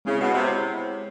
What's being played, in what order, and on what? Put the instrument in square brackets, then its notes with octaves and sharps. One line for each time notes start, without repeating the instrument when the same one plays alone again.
[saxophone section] C#3 [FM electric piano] G#3 C4 E4 G#4 C#5
[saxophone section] B2
C3